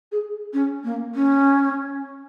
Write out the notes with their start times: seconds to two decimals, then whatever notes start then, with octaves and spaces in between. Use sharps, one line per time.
0.12 G#4
0.53 C#4
0.84 A#3
1.15 C#4